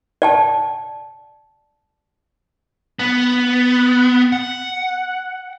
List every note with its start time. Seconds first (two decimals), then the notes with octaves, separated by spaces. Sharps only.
0.22 D5 G5 A5
2.99 B3
4.32 F#5